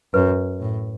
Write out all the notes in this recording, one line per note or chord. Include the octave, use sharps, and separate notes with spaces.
F#2 B4
A2